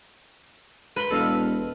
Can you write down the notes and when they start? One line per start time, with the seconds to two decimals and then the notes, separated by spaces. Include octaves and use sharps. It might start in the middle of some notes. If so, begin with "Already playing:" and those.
0.96 B4 B5 C6
1.10 E1 A4 D#5 F5